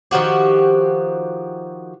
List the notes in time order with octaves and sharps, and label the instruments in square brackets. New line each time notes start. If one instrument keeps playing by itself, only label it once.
[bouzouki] D#3 F3 F#4 G4